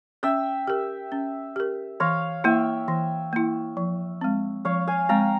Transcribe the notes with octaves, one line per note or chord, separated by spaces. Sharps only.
C#4 E5 G5
G4 A#4
C#4
G4 A#4
E3 C#5 F5
A#3 E4 E5 G5
E3
A#3 E4
F3
G#3 C4
F3 C#5 F5
F5 G#5
G#3 C4 G5 A#5